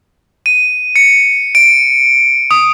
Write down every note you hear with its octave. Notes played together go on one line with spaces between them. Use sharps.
D#7
C#7
D7
D#6